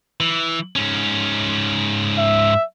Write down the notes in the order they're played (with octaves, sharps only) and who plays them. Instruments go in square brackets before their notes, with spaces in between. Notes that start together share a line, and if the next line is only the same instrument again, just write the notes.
[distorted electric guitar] E3
G#2 C#4
[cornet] E5